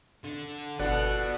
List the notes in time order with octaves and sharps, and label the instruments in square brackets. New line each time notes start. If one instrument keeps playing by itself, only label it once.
[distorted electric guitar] D3
[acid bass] G1 [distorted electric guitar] F#4 B4 [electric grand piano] A4 D5 F#6 [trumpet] F#5